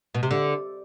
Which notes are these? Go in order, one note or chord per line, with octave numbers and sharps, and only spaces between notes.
B2
C3
D3